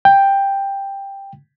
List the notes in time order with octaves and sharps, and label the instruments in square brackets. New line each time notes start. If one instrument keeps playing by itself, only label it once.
[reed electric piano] G5